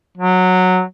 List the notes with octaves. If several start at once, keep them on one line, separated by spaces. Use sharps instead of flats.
F#3